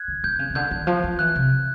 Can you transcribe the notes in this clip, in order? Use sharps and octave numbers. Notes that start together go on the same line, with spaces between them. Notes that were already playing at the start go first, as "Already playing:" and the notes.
Already playing: F#6 G#6
D3
D3 G6
C#3
C#3
D3 G6
D#3
F3
F3
E3 F#6
C3